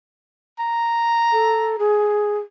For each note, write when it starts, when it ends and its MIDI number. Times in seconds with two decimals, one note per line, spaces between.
0.59 1.81 82
1.33 1.76 69
1.79 2.39 68